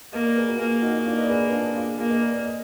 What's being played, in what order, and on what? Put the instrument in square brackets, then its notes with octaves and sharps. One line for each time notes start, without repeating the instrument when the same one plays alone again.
[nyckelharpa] A#3 [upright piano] B4 D#5
[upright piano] A#4 D5
G#4 B4
F#4 A#4
[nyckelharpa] A#3 [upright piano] F4 G#4
[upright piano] D#4 F#4
D#4
D4 F4
B4 D#5
D5
G#4 B4
D4 F4
F4 G#4
[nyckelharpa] A#3 [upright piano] F4 G#4
[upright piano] B4 D#5
A#4 D5
D5
D#5